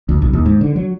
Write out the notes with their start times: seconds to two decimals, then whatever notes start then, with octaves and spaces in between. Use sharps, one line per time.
0.09 D2
0.22 B1
0.33 D#2
0.46 G#2
0.61 D3
0.76 F#3